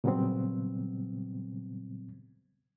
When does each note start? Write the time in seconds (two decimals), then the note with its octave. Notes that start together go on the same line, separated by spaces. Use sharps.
0.04 A#2 C#3 F#3 G3 B3 C4